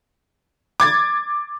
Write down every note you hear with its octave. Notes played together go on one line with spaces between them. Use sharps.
D6 G#6 A6